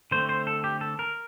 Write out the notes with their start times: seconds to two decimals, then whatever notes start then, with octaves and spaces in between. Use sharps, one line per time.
0.11 D3 A3 C4 C5
0.29 C5
0.47 A4
0.64 G4
0.81 A4
0.99 A#4